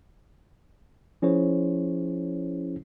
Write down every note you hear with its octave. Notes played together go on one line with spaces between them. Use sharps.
F3 C#4 E4 G#4 C5 C#5